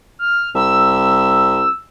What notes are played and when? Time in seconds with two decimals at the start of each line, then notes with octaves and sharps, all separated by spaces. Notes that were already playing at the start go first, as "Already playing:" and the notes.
0.19 F6
0.55 C2 E6